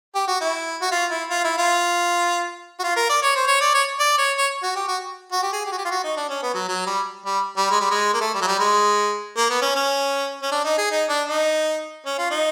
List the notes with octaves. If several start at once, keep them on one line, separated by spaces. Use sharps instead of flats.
G4
F#4
E4
F#4
F4
E4
F4
E4
F4
F#4
F4
A#4
D5
C#5
C5
C#5
D5
C#5
D5
C#5
C#5
F#4
G4
F#4
F#4
G4
G#4
G4
F#4
G4
F4
F#4
D#4
D4
C#4
B3
F#3
F#3
G3
G3
G3
G#3
G3
G#3
A#3
A3
G3
F#3
G3
G#3
A#3
B3
C#4
C#4
C#4
D4
D#4
G#4
D#4
D4
D#4
C#4
F4
D#4